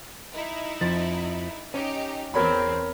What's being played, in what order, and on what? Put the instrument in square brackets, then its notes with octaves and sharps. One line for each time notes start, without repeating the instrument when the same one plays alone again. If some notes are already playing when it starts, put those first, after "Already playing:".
[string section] D#4 E4
[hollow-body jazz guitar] F2 F3 [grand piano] A6
[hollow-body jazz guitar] C#4 [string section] D#4 G4
[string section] E2 C4 [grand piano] A#4 C#5 B5